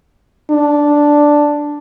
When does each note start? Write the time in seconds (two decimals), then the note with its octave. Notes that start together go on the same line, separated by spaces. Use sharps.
0.51 D4